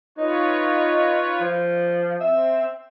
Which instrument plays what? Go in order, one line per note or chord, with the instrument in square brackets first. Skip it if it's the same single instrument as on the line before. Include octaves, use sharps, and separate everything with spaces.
[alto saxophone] D#4 [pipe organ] F4 B4 C#5
[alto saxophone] F3
[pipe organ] C4 [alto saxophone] E5